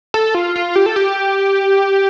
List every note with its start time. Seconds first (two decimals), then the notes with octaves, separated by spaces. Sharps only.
0.14 A4
0.35 F4
0.56 F4
0.76 G4
0.86 A4
0.96 G4